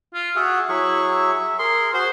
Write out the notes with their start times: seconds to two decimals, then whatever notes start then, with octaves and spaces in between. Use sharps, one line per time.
0.14 F4
0.36 F#4 G#4 E5 F#5
0.69 F#3 E4 G#4 C#6
1.11 E5
1.59 G#4 A#4 C6
1.93 F#4 G#4 C5